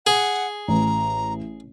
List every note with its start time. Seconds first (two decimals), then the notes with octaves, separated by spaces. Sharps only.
0.07 G#4 F#5
0.68 A1 A#5